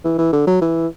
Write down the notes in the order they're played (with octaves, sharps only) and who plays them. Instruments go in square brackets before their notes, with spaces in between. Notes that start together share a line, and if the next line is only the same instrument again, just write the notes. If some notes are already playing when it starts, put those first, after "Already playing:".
[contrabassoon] E3
E3
D3
F#3
E3